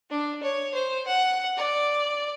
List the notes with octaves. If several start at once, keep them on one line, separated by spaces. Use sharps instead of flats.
D4
C#5
C5
F#5
D5